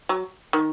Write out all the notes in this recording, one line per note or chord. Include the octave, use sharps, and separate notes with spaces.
F#3
D#3